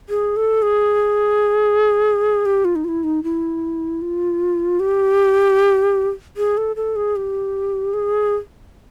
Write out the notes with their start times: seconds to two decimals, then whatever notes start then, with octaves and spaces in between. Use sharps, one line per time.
0.09 G#4
0.36 A4
0.62 G#4
2.45 G4
2.65 F4
2.75 D#4
2.84 F4
2.88 E4
3.03 D#4
3.23 E4
4.02 F4
4.80 G4
6.37 G#4
6.57 A4
6.76 A4
6.96 G#4
7.16 G4
7.94 G#4